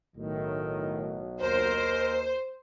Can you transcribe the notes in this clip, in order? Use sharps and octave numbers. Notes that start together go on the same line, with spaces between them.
B1 A2 D#3
D#2 A#4 C5